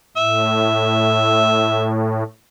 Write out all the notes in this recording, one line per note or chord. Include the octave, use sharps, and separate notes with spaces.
A2 E5